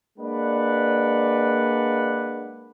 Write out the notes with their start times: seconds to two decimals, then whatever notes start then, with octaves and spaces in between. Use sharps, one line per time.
0.18 G#3 A#3 D4 B4 D5 F#5